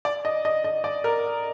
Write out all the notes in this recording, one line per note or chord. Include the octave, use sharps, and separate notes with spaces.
D5
D#5
D#5
D#5
D5
A#4